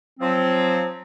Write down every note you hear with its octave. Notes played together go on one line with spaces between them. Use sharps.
F3 F#3 C4